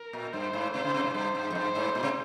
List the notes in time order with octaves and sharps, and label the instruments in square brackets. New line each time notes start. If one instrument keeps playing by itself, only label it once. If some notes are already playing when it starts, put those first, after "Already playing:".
Already playing: [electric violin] A#4
[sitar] A#2
[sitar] G2 [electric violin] C5
[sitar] G#2
[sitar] C3 [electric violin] C5
[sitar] C#3
C3
G#2
[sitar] G2 [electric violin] C5
[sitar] G2
F2
[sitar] G2 [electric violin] C5
[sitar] G#2
A#2
C3